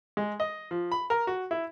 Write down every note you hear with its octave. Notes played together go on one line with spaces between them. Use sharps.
G#3
D#5
F3
B5
A#4
F#4
E4